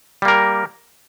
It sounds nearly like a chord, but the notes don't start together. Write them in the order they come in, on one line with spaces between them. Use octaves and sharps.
G3 A#3 A#4